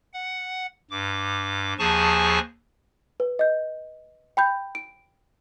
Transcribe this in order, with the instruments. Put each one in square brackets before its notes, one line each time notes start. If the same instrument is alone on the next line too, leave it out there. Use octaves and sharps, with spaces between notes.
[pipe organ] F#5
G2 D6
D#2 F3 G#4 G#5 A5 C#6
[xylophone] B4
D#5 G6
G5 B5 G6
D7